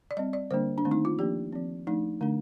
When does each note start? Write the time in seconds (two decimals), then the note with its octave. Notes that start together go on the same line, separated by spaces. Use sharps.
0.11 D5
0.17 G3 C4 D#5
0.33 D5
0.51 D3 G3 A#3 D4 C5
0.78 D4
0.85 D#3 A3 C4
0.91 D#4
1.05 F4
1.19 F3 A#3 D4 G4
1.53 F3 C4
1.87 F3 A3 D4 D#4
2.21 D3 A3 D4